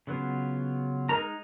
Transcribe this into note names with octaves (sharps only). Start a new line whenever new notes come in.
C#3 F#3 B3 F4
G#3 D#4 A#4 A#5